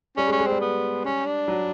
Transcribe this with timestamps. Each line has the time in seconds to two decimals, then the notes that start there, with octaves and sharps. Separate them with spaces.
0.17 G3 C#4
0.28 G#3
0.32 C#4
0.39 G#3
0.47 G3 C4
0.61 B3
1.05 C#4
1.26 D4
1.48 F#3